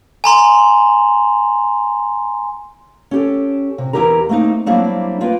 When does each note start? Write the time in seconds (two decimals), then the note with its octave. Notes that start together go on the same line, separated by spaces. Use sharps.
0.24 G#5 A#5 C6
3.11 C#4 G4 A4
3.78 C3
3.93 E2 C#3 E4 G4 A#4 A#5
4.29 A3 A#3 C4 D4 D#4
4.66 F#3 G3 A#3 C4 D4 E4
5.21 A#3 F4 B4 G5